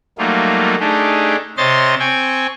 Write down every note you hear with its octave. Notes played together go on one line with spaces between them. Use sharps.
F#3 G3 A3 A#3 D#4 F4
A3 D4 D#4 G4 G#4
C3 C5 C#5 D#5 C6 A6
C4 G5 G#5 C#6